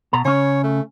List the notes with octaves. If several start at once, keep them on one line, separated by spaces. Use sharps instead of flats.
B2 A#5
C#3 C#4 C#5
A3